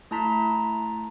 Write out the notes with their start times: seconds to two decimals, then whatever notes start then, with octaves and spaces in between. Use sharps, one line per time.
0.11 A3 E4 A5 A#5 C6 B6